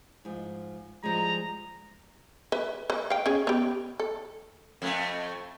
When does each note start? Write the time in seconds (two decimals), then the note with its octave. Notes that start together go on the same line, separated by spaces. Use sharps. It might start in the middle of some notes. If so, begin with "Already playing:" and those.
0.25 G#2 F3
1.03 F3 G3 G#3 A#5
2.52 B4 E5
2.90 B4
3.10 F5 G5
3.26 C#4 G#4
3.47 B3 G4
4.00 A4
4.82 F2 A3